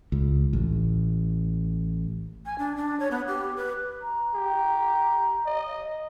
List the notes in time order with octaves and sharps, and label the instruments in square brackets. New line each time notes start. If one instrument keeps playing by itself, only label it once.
[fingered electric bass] C#2
A1
[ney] G#5
D4
D4
C#5
B3
G4
B4
[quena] A#5
[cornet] G4
D#5